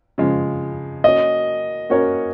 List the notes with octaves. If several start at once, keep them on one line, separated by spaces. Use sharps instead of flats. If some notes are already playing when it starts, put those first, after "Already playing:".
C#3 F3 G#3
A#3 C#4 F#4 A#4 C#5 D#5
A#3 C#4 F#4 A#4 C#5